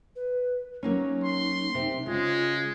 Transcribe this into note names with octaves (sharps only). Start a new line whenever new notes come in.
B4
F#3 A#3 C#4 D#4
C6
C3
C#3 G#3 F4